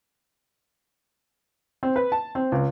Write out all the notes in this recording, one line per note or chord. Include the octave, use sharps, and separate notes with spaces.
C4
B4
A5
C4
C#2